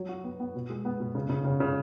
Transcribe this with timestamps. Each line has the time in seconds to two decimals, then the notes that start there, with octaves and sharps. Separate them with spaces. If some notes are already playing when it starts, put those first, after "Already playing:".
Already playing: F#3
0.09 F#4
0.24 B3
0.40 B3
0.55 B2
0.70 G#3
0.85 B3
1.00 B2
1.15 C#3
1.30 C#3
1.45 C#3
1.60 C#3